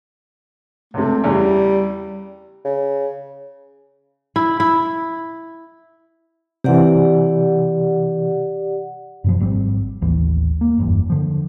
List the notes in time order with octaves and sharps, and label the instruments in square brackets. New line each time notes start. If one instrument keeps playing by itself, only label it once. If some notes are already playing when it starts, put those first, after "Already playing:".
[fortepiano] C#2 C3 [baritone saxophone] A3
[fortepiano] E2 C#3 [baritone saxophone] G3
[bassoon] C#3
[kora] E4
E4
[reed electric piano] C3 E3 [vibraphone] G4 D5 F#5
[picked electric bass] F#2 B2 F3
G#1 G3 C4
A1 D#2 E3
A#3
F#1 E2 G2
D3 F3